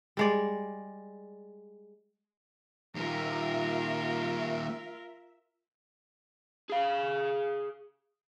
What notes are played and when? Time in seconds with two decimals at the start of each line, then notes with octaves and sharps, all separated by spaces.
0.17 G3 G#3 D5
2.95 D#2 A#2 F4 A#4 E5
6.70 G#4 F5